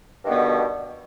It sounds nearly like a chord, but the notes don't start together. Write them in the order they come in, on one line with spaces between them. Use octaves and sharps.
G2 D#3 D3 B3 B2